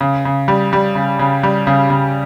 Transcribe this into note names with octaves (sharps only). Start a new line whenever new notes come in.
C#3
C#3
G3
G3
C#3
C#3
G3
C#3
C#3